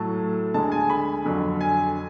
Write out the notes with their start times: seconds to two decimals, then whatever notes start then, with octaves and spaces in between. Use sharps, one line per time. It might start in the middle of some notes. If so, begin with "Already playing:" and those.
Already playing: A2 F#3 A3 A5
0.54 D2 D3 G#3 A5
0.72 G#5
0.90 B5
1.25 F2 D3 F#3
1.61 G#5